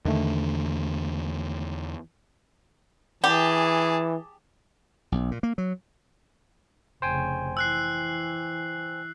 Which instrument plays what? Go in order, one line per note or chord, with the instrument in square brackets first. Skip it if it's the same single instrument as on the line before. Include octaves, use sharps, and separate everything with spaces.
[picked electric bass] E2 D3 [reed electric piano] D#3 A3
[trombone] E3 [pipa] G4 [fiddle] G#4 A5
[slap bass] B1
A#2
A#3
F#3
[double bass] F1 C#3 [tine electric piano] C5 G5 G#5
[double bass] E3 [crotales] E6 F#6 C7